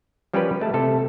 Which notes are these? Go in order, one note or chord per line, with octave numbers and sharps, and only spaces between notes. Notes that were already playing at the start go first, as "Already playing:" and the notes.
F3 G3 C#4 G4 A#4 B4
G#3 A3 A5
C3 A3 A4